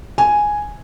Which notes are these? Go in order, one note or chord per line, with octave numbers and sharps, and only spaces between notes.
G#5